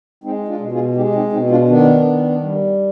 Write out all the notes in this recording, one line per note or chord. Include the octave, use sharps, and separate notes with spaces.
G#3 C4 D#4
D4 F4
B2
F4 G#4
G#3 D#4 G4
C4 D#4
B2 C4 D#4
D4 F4
D#3 B3 D4
D#3
G3